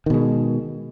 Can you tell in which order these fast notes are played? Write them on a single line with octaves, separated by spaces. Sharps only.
D#3 B2 G#3